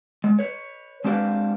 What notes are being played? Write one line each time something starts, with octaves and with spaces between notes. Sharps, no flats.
G#3
B4 C#5
G#3 C4 D4 G4 B4 F5